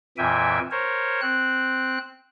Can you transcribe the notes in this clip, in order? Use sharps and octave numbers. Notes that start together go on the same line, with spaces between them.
F2 A#2 E3 E5 G5 G#5
A#4 C5 C#5
C4 F#6